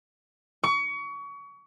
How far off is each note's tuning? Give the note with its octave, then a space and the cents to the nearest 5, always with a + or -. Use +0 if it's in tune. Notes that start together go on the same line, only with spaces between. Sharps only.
C#6 +30